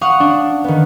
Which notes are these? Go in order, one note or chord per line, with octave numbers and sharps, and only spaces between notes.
F5 F#5 C#6 D#6
D4
D#3 B3